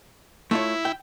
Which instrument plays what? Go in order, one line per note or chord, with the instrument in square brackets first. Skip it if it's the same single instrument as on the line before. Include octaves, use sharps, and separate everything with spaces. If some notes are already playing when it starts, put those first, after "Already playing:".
[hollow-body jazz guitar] A3 F4 C#5 [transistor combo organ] E4
[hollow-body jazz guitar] G5